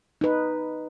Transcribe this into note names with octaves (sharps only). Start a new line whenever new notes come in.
D#4 B4